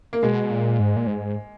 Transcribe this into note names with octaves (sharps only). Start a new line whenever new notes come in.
A#3
B2 G#3
A#2
G#2
A#2
G#2